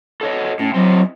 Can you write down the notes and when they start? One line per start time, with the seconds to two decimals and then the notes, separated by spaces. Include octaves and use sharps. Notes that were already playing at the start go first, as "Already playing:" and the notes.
0.21 A4 C#5 D#5
0.59 A2 C#4
0.74 F#3 C4 E4 D#5